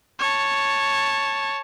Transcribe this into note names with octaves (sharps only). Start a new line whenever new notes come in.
C#5 A5